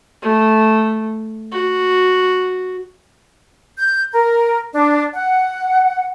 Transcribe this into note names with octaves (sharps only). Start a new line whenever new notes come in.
A3
F#4
G6
A#4
D4
F#5